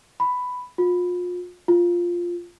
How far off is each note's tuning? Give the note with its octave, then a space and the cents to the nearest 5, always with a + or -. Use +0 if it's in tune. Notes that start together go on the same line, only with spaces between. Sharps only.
B5 +10
F4 +35
F4 +0